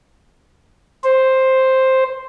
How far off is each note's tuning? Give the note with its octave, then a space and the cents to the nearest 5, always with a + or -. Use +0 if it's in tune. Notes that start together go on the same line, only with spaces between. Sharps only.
C5 +5